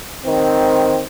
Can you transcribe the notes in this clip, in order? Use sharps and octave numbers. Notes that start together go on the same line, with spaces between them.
D#3 C4